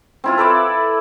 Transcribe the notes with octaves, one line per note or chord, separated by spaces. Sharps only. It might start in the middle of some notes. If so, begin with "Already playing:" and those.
C4 E4 F4
A4 B4 D5 E5